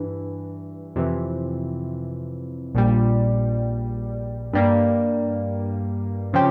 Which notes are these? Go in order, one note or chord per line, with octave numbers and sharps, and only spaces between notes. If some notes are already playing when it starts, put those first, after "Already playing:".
Already playing: G2 E3
F2 C3 E3
A#1 A#2 G3
G2 G3 A#3
C#3 F3 C4 G4